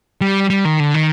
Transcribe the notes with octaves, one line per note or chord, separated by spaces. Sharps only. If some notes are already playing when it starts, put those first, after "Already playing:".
G3
G3
D#3
D3
D#3